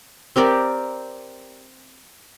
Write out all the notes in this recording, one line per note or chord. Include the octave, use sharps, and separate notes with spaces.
C4 G4 A#4 D5